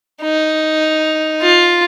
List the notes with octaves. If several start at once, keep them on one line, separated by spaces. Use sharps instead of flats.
D#4
F4